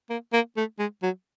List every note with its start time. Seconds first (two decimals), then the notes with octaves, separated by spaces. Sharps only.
0.10 A#3
0.33 A#3
0.57 A3
0.79 G#3
1.03 F#3